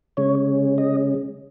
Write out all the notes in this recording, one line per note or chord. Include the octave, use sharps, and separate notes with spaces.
C#3 G#3 C#4 C#5
D#5